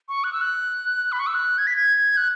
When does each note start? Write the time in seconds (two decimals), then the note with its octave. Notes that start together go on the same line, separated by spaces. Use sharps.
0.09 C#6
0.24 F#6
0.32 E6
0.41 F#6
1.12 B5
1.20 C#6
1.27 E6
1.34 F#6
1.58 G#6
1.67 B6
1.76 G#6
2.17 F#6